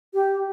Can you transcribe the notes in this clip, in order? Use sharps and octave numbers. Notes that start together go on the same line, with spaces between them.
G4